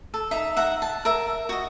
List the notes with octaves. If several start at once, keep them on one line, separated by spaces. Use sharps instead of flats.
A4
D#4 E5
E5 F#5 A#5
A5
A#4 E5
F#4 D#5